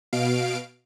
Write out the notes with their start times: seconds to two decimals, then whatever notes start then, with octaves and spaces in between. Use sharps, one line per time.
0.13 B2 F5 D7